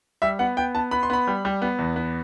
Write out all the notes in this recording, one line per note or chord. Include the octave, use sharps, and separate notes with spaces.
G3 E5
B3 F#5
B3 G5
B3 A5
B3 B5
C6
B3 B5
G3
G3
B3
E2
B3